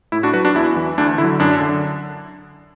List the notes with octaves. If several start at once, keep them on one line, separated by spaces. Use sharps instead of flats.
A2 E4
D4 F#4
F#3 F#4 B4
D4 F#4
E2 E4
E3
D2 D4
D3 E4
F#3
F#2 D4
D3